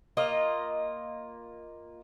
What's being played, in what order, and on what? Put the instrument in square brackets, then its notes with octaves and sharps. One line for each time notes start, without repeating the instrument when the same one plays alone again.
[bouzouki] A#3 F4 D#5